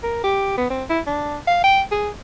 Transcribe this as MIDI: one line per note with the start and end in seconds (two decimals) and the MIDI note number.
0.03 0.23 70
0.24 0.54 67
0.57 0.66 59
0.70 0.84 60
0.89 1.00 64
1.07 1.37 62
1.47 1.62 77
1.64 1.82 79
1.91 2.09 68